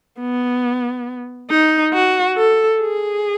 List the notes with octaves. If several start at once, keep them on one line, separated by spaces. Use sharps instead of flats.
B3
D#4
F#4
A4
G#4